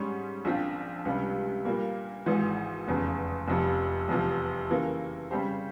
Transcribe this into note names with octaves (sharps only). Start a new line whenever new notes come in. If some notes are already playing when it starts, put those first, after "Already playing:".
Already playing: G#2 G3 C#4
A#1 A#2 F3 C4 F4
C#2 C3 G3
A#2 G3 A#3
G#1 G#2 E3
F1 E2 C#3
F1 F2 C3
F1 E2 C3 F3
C#3 E3 A#3
C#3 G3 C4 G4 C5